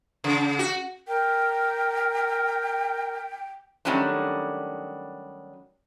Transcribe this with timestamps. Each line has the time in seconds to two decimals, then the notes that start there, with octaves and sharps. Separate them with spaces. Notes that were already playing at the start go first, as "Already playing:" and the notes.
0.24 C#3
0.59 F#4
1.08 A#4 G5
3.85 D#3 F#3 G3 A3 C#4 D4